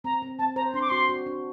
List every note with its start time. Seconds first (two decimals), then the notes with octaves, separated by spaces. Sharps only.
0.04 C4 A#5
0.22 C4
0.39 C4 A5
0.56 C5 A#5
0.74 D4 C6
0.82 D6
0.89 F#4 C6
1.09 F#4
1.26 D4